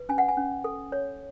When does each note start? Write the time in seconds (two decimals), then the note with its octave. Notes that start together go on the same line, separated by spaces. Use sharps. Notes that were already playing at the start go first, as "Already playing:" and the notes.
Already playing: B4
0.09 C#4 G#5
0.18 F#5
0.29 G#5
0.37 C#4
0.64 A4
0.92 C#5